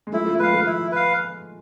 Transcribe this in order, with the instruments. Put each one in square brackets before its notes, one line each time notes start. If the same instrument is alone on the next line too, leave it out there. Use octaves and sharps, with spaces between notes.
[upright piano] G#3
[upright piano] F3 A3 [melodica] E4
[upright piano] F3 A3
[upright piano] G#3 [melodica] B4
[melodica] F5
[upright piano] F3 A3
[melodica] E4
B4 F5